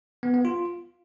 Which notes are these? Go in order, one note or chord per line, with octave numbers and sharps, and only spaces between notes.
B3
B3
F4